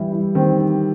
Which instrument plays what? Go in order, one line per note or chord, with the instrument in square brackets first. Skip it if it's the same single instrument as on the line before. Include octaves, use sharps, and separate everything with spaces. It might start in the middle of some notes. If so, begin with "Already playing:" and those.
Already playing: [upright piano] E3 [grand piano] G3 E4 G4
[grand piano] E4
[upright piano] D#3 [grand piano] C4
[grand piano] C4